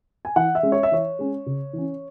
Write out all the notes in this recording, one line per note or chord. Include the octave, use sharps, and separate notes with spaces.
G#5
E3 F#5
E5
G#3 C#4
C#5
E5
E3 C#5
G#3 C#4
C#3
E3 C#4